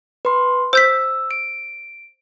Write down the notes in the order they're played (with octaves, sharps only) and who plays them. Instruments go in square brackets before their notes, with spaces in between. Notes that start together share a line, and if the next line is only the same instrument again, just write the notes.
[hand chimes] B4 C6
[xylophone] C5 G6 B6 [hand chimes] E6
[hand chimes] D7